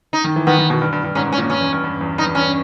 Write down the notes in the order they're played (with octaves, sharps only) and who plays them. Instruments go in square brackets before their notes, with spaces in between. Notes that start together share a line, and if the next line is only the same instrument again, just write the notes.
[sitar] D#4
[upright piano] D#3
E3
[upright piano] D#3 [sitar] B3
[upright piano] D#3
B2
G2
G2
G2
[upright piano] G#2 [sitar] C#4
[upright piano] G#2
[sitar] C#4
[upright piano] A#2
[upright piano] G2 [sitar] C#4
[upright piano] E2
G2
G2
E2
[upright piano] G2 [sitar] D#4
[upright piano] E2
[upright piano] G2 [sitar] C#4